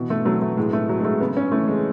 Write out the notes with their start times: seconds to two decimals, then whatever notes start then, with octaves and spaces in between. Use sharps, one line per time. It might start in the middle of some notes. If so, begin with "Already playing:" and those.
Already playing: B2 E3
0.10 A3
0.25 F#3 A3
0.41 A3
0.57 A2 G#3
0.73 A3
0.89 F#3
1.00 G#3
1.04 A3
1.20 C#3 B3
1.37 C#4
1.52 E3 A3
1.68 G#3